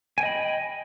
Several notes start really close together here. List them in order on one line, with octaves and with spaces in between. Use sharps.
G#5 G5 D#5 B5